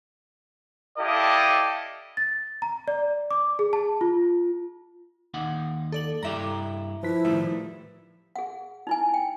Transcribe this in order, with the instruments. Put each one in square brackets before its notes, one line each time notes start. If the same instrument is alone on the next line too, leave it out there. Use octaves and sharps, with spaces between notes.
[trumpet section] E4 G4 A4 D5 D#5 F5
[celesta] A6
A#5
D5
D6
G#4
A5
F4
[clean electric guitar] D#2 D#4 F#5
[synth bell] A4 D5 F#7
[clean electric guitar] G2 E4 G4 [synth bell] E5 A#5
[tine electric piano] F3 B4 B6 [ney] E4
[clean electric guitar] A2 D#3 G3 [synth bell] E5
[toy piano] G#4 F#5
D#4 E4 G#5
G5